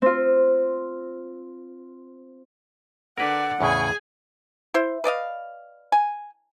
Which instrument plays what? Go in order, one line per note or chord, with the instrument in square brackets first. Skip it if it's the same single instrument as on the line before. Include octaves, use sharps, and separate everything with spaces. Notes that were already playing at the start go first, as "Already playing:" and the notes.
[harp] C4 F4
[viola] D3 D5 [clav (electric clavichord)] A#4 B4 [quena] F#5
[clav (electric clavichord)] E2 A2 C#3 [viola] G#4 G#5
[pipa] E4 C5
B4 D5 D#5 F5
G#5